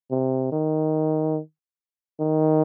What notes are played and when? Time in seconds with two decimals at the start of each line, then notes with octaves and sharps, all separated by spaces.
0.11 C3
0.52 D#3
2.20 D#3